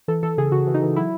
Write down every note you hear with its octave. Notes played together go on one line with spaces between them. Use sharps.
E3 A4
E3 A4
C#3 G#4
C#3 F#4
E3
D#4
E3
F#3 E4